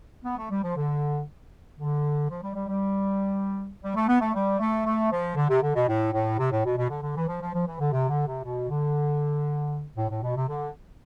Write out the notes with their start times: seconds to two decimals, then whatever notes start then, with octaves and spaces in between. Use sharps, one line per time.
0.24 B3
0.37 A3
0.50 G3
0.62 F3
0.76 D3
1.78 D3
2.29 F3
2.42 G3
2.55 G3
2.68 G3
3.83 G3
3.95 A3
4.07 B3
4.20 A3
4.34 G3
4.59 A3
4.85 A3
5.11 F3
5.35 D3
5.49 C3
5.62 D3
5.75 B2
5.88 A2
6.13 A2
6.38 C3
6.51 A2
6.64 B2
6.77 B2
6.90 D3
7.02 D3
7.16 E3
7.28 F3
7.41 F3
7.54 F3
7.66 E3
7.79 D3
7.92 C3
8.09 D3
8.26 C3
8.43 B2
8.69 D3
9.96 A2
10.09 A2
10.22 B2
10.35 C3
10.47 D3